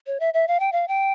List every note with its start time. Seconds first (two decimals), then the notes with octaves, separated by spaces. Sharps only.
0.07 C#5
0.20 E5
0.34 E5
0.48 F5
0.60 G5
0.72 F5
0.88 G5